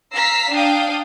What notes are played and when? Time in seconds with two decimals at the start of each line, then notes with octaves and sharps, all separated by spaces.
0.15 F5 A#5 E6 B6 C7
0.53 D4 F5 G5 D#6